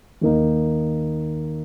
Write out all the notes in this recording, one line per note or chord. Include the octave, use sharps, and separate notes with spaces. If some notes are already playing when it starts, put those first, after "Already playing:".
D#2 D#3 A#3 D#4